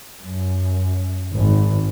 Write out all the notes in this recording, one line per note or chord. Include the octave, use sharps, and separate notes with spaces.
F#2
G#1